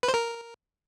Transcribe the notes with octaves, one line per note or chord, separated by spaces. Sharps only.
B4
C5
A#4